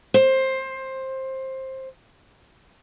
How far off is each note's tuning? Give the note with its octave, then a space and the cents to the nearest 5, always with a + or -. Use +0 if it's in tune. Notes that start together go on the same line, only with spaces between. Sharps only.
C5 +15